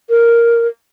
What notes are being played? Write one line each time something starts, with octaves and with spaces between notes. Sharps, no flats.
A#4